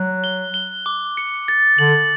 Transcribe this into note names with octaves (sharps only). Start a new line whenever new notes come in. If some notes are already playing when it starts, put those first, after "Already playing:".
Already playing: F#3 F#6
G7
G7
D6
C#7
A6
D3 F#7